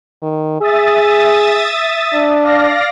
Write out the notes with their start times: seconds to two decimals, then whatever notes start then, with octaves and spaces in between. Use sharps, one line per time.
0.23 D#3
0.61 G#4 E5 D#6 A6
2.14 D4
2.44 D5 F5 A#6